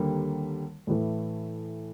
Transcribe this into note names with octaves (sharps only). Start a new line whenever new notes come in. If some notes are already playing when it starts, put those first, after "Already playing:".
Already playing: D#2 D3 G3 A#3
A2 E3 A3